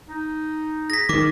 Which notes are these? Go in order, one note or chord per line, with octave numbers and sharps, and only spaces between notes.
D#4
G#4 A#6 B6
D#3 D6